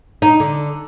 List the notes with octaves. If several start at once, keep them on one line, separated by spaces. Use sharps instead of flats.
D#4
D3